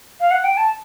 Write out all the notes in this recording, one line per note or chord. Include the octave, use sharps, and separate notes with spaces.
F5
F#5
G5
A5